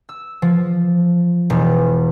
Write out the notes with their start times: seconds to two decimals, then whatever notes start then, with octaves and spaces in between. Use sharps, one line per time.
0.09 E6
0.42 F3
1.50 E1